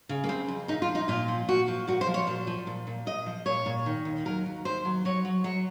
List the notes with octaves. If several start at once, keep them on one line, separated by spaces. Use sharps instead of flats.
C#3
A#3
C#3 C4
F2
A#2 D#4
F4
F3
D#4
A#2 F4
F3
A#2 F#4
F3
A#2 F#4
C5
F3
C#5
A#2 C5
F3
A#2
A#2
A#2 D#5
F3
A#2 C#5
A#2
D#3
D#2
F#3 A#4
D#2
D#2 C5
F#3
F#3 C#5
F#3
F#3 C#5